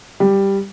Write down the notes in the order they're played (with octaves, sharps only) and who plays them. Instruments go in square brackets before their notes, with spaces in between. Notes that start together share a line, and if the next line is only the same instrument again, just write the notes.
[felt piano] G3